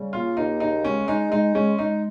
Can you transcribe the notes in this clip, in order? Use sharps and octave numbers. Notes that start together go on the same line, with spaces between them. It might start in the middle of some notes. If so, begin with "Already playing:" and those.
Already playing: C#3 G3
A#3 F4
D#2 D#4
C#3 D#4
G#3 C#4
G#3 D#4
G#3 D#4
G#3 C#4
G#3 D#4